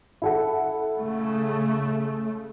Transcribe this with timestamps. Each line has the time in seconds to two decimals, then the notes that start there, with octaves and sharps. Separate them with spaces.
0.22 E4 A4 F#5
0.98 C#3 A3